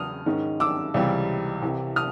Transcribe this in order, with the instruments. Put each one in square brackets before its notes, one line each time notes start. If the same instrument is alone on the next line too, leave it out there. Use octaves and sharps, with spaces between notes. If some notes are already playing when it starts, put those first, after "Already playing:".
Already playing: [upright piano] E2 C#3 F#3 B3 D#6 F6
G#2 D#3 G#3 C#4
D6 E6
C#2 C3 E3 G3
C2 C3 E3
D#6 F6